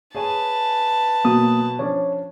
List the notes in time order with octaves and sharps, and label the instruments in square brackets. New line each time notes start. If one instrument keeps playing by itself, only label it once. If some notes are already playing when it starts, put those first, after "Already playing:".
[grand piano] G#4 C#5 G#5 [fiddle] B4 A5
[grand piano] B2 F#3 [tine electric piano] A#3 D#6
[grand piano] F3 C#4 D4 [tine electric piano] C#5